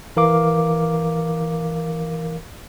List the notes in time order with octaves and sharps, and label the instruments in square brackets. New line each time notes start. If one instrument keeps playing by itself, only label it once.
[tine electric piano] E3 A#4 F5 D6